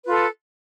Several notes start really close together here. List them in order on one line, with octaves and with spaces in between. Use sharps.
B4 F4 A4